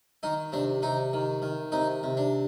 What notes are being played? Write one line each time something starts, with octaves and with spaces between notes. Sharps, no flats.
D#3 D#4
C3 D4
C3 D#4
D#3
D#3
C3 D#4
C3
D4